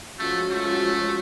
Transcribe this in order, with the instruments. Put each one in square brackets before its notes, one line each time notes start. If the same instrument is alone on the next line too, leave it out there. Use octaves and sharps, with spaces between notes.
[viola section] F3 G#3 C#4 F#4 [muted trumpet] A3
[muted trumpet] A3